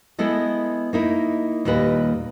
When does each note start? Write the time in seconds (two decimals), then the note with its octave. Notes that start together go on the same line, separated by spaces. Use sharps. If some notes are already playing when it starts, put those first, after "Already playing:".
0.18 G#3 B3 E4 A4 D#5
0.93 A#3 D#4 E4
1.65 D#2 A#2 G3 B4 D#5